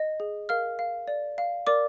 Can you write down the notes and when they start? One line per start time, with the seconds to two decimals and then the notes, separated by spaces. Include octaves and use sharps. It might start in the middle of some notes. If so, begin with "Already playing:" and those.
Already playing: D#5
0.20 G#4
0.49 A#4 F5 F6
0.79 F5
1.08 D5
1.38 F5
1.67 A#4 D5 D6